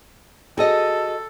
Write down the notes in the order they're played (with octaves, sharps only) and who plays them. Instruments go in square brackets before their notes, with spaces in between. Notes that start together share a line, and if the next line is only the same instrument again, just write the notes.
[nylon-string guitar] F#4 G#4 D#5 [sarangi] A4